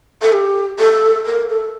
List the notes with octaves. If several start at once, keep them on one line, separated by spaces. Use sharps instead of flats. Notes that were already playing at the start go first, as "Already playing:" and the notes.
A4
G4
A4
A#4
A4